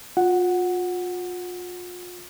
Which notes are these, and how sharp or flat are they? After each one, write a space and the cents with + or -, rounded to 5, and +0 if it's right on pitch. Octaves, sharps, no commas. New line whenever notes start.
F4 +35 F#5 +0